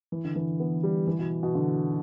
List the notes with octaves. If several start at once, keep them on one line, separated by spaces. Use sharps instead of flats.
E3
D3
E3
B3
G3
E3
B2
B2
D3